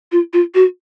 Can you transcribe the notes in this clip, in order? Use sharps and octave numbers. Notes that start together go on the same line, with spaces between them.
F4
F4
F#4